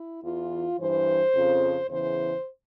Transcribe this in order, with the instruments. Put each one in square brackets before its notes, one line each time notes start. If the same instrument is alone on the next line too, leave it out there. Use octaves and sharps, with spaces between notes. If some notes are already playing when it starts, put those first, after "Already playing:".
Already playing: [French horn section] E4
E2 E3 F4
G2 E3 C5
F2 C#3 F3
E2 C#3 E3 C5